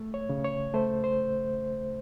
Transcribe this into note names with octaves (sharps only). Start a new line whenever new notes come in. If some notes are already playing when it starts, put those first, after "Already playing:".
Already playing: A3
C#5
C#3
C#5
A3 C5
C5